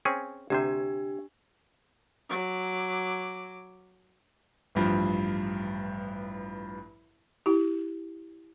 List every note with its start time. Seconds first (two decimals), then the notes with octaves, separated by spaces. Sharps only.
0.05 C4 C#4 G#4
0.50 D2 C3 D4 G4 C5
2.29 F#3 D6
4.75 A1 G2 F3
7.46 E4 G4